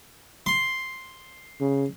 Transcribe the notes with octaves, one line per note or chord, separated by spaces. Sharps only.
C6
C#3